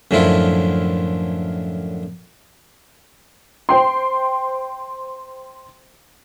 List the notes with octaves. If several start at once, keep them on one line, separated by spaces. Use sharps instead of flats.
F#2 A2 D3 F3 E4 F4
C5 G5 C6